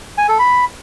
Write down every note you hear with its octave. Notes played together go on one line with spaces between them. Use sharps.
G#5
A4
B5